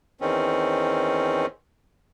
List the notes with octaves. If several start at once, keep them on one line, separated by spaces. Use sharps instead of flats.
E2 D#3 C4 C#4